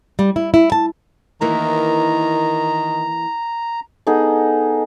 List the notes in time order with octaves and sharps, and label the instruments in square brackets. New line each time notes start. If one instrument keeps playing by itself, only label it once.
[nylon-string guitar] G3
E4
E4
A5
[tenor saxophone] D#3 [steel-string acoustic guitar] E3 A#3 E4 [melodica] A#5
[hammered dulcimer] B3 D#4 G#4 A4